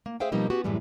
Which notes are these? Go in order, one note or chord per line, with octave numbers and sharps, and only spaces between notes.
A#3
G#4 C5 E5 F5 G5
B2 F3 G3 A#3 C4 D#4
B3 C#4 F#4 G4
F#2 A2 E3 G3 G#3